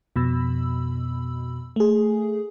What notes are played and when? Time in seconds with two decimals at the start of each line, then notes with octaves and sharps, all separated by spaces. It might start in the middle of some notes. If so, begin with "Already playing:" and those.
0.16 F2 B2 B5 E6
1.76 A3 G#4